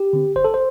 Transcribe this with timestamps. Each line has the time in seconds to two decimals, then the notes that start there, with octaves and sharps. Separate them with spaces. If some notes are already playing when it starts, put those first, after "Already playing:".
Already playing: G4
0.13 D3 C4
0.36 G1 C5
0.45 A4
0.54 C5